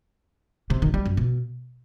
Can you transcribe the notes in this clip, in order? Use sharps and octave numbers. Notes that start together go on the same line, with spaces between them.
C3
D#3
G3
F#2
B2